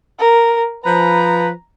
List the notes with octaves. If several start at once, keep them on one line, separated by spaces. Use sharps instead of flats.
A#4
F3 B4 A#5